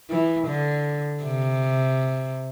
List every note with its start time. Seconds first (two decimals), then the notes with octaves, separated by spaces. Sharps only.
0.10 E3
0.48 D3
1.24 C3